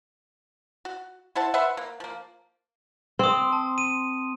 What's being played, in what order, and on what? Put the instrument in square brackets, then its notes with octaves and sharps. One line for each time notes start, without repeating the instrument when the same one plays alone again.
[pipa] F#4
E4 C5 F#5 A5
B4 C5 E5 F#5
A#3
F3 A#3
[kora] C4 [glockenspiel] C6 D#6
[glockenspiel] A5
D#7